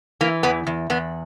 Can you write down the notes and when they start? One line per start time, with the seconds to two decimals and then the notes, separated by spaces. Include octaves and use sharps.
0.21 E3 A#3
0.43 E2 B3
0.67 E2
0.90 E2 B3